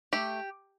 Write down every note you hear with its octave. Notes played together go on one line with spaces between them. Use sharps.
A3 G4